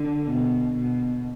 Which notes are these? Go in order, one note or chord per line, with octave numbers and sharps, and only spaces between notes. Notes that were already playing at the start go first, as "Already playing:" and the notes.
Already playing: D3
B2
B2